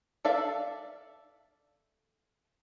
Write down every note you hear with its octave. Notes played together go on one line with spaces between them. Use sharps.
A4 D5 E5 F5